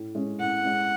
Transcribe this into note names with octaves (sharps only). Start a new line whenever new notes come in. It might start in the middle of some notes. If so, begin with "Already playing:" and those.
Already playing: A2
G#3 C#4
A2 F#5
G#3 C#4